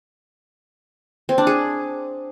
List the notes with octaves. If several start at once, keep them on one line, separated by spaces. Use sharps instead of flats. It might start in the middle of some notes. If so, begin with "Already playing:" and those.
C4
D4
G#4